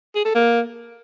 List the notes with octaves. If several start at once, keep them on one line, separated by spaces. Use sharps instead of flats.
G#4
A4
A#3